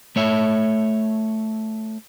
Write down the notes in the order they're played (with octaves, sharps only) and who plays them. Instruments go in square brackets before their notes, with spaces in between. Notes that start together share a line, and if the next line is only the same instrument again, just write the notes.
[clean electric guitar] A3 C#5 E5